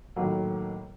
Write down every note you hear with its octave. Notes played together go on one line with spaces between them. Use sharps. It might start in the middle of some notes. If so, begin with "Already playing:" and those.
A2 D#3 F#3 A#3